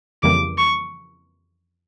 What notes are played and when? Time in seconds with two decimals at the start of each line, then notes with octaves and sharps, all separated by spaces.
0.23 F2 C#3 E3 G3 A#3 D6
0.58 C#6